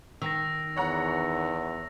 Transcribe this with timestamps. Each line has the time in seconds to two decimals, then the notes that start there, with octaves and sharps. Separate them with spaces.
0.22 D#3 E6 A#6
0.76 E2 C#5 F#5 A#5